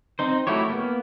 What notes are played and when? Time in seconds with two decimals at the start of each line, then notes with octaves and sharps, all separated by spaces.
0.19 C4 D#4 C5
0.47 A3 E4 F#4 G4 C#5
0.70 A#3 B3